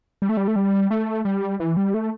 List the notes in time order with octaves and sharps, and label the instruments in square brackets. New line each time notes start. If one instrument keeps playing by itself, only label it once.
[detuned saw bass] G3
A3
G3
A3
G3
A3
G3
E3
G3
A3